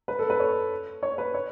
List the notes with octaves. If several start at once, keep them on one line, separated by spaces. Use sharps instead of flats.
B4
A4
B4
C#5
C#5
B4
C#5